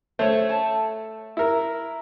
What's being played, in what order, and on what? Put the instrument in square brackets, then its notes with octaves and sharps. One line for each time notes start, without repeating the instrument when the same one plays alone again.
[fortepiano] A3 [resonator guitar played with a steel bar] C5 C#5
[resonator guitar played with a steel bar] A5
[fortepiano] E4 A#4